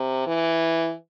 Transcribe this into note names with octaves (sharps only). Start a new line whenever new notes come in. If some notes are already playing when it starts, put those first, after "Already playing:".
Already playing: C3
E3